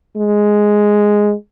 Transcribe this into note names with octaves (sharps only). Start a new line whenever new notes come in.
G#3